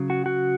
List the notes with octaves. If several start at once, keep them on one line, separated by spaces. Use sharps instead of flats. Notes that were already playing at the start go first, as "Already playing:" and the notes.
Already playing: C#3 F#3
F#4
F#4